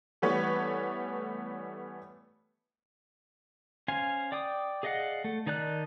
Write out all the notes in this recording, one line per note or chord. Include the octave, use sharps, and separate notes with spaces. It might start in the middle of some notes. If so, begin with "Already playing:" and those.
E3 G3 A3 B3 B4 C#5
C#4 C5 F5 G#5
D5 G5 D6 D#6
G#4 D5 D#5 F5 F#5
A3
D#3 D#4 D5 A5 F#6